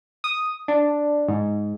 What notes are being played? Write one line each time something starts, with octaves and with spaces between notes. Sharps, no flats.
D#6
D4
G#2